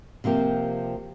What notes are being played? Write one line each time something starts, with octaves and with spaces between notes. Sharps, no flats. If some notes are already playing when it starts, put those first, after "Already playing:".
C3 F3 A#3 G4